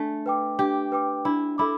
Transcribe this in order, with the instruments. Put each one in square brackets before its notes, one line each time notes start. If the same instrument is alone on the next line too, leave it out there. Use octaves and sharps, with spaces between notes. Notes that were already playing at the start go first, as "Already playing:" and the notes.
Already playing: [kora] A3 [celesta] D4
[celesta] B4 G5 D6
[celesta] D4 [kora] G4
[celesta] B4 G5 D6
[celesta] D4 [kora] E4
[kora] E4 [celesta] A4 E5 B5 D6